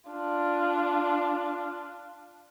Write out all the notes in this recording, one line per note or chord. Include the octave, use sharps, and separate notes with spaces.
D4 F4